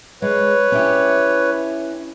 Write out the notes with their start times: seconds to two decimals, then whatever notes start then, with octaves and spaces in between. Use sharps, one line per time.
0.22 G#3 B4 C#5
0.72 C#4 E4 G4